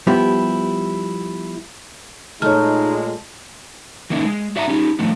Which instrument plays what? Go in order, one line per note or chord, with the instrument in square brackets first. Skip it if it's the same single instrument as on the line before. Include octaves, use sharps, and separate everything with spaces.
[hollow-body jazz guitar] F3 G3 B3 E4 G4
[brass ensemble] A#2 G#3 [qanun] A3 [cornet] D#4 [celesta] C#5 F6
[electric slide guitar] E3 A#3 C#4 D#4 E4
G#3
F#4 D5 E5 F#5 G#5 A#5
C#4 D#4 G4
D#3 F3 A3 D4